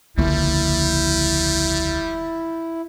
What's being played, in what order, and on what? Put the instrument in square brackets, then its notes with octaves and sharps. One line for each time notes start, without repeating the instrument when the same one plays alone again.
[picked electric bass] E1 C#2 D3 [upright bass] F3 A#3 [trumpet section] G3 [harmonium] E4